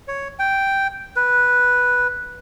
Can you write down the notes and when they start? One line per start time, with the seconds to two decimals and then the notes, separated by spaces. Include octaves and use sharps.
0.08 C#5
0.39 G5
1.16 B4